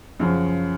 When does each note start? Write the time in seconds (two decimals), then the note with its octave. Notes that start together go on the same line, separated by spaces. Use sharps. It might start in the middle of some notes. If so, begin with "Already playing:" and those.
0.20 F#2 C#3 F3